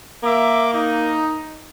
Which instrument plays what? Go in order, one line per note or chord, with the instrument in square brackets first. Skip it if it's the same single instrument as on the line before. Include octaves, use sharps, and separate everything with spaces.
[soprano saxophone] A#3 [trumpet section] E5 D6
[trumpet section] D#4